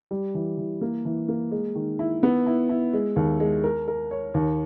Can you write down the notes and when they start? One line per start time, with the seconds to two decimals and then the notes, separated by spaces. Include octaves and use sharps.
0.11 G3
0.35 E3
0.58 E3
0.81 A#3
1.05 E3
1.28 A#3
1.51 G#3
1.75 D#3
1.99 E4
2.23 B3
2.46 E4
2.69 E4
2.93 G#3
3.16 D#2
3.40 G#3
3.64 A#4
3.88 A#4
4.11 C#5
4.34 D#2